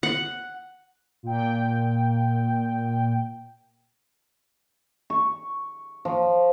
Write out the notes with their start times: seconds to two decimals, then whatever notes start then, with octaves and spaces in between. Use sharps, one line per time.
0.03 F#5
1.23 A#2 G5
5.10 C#6
6.05 F3